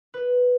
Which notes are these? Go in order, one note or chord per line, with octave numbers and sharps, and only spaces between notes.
B4